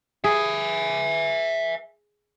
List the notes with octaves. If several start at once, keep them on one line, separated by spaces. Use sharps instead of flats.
G#4 E5 G#5